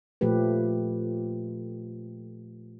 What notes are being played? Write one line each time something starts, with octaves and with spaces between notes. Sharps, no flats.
A#2 F3 A3 G4 B4